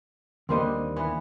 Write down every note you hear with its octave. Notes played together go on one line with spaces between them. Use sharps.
D#2 D3 G3 A#3 C4 D#5
E3 B3